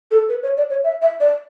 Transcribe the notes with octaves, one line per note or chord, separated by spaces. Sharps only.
A4
B4
C#5
D5
C#5
E5
E5
D5